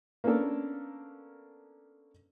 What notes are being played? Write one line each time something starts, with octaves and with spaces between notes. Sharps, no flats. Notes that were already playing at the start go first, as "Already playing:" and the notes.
A#3 B3 C#4 D4 A4 A#4